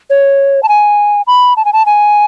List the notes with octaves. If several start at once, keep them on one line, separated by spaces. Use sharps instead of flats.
C#5
A5
G#5
B5
A5
G#5
A5
G#5